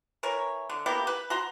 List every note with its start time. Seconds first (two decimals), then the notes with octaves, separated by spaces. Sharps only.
0.23 E3 A#4 C#5
0.69 D3
0.86 A#3 B3 E4 G4
1.07 B4
1.30 F#4 A#5 C6